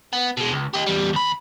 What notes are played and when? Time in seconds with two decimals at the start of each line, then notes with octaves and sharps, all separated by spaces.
0.13 B3
0.37 B2 G#3
0.52 C#2
0.74 G4 D#5
0.86 E2 G3
1.13 D#2 B5